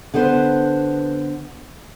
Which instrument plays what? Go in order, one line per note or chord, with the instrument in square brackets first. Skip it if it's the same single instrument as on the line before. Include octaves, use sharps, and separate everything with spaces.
[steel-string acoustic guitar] D3 B3 B4 C5